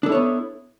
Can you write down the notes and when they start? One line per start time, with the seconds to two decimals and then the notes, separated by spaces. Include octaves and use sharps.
0.03 D4
0.06 A4
0.09 E4
0.12 C#5
0.15 B3